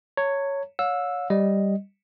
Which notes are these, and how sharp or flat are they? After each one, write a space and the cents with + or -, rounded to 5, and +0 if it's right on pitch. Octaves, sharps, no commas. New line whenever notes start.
C#5 +0 A#5 -45
C#5 +20 F5 +45 E6 +0
G3 +0 D#5 +0